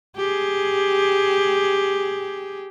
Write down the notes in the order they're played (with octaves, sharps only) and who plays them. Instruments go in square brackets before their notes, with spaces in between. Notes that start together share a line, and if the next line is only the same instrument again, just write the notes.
[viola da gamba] G4 G#4